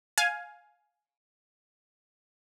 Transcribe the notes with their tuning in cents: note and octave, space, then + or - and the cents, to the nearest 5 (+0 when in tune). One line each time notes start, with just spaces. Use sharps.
F5 +10 G#5 +10